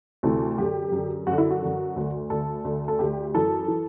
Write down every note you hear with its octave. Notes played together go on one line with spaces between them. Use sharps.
D2 C3 E3 A4
F#2 D3 G4
F#2 D3
F#2 D3 F#4
E4
F#4
F#2 D3
D2 D3
D2 D3 A4
D2 D3
A4
D2 D3 G4
F#2 E3 A4
E3